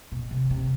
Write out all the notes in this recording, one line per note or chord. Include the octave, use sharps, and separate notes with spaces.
B2
C3
C3